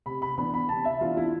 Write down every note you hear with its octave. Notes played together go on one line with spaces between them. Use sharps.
C3 B5
B5
E3 B3 D4 B5
B5
C3 A5
E5
E3 B3 D4 F4
E4